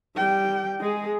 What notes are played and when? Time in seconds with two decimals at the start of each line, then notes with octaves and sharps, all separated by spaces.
0.16 G3 G5
0.81 G#3 G#4